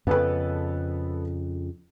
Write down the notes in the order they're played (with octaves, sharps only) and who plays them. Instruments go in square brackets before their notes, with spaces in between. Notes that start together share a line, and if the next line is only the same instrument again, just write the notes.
[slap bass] F2 C#3 [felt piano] B3 A4 B4